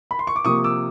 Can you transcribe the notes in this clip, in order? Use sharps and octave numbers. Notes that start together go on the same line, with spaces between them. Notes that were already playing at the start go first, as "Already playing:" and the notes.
B5
C6
C#6
D6
C3 F3 A#3 C#6 D#6
D6 E6